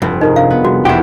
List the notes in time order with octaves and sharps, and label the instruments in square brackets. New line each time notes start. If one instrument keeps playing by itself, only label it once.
[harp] F1 [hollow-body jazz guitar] C2 G2
[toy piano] D#4 [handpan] G#4 A#4 D#5
[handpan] D4 [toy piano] F5
[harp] B3
[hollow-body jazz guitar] C2 [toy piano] F#4 [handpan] G#4
[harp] E1 E2 [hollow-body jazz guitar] E4 G4 [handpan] F#5